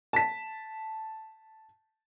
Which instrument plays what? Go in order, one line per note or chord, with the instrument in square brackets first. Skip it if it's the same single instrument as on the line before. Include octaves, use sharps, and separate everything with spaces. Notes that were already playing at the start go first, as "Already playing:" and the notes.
[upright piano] A5 B6